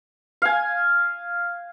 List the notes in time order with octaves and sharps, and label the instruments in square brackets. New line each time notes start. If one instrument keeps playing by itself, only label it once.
[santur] F5 G#5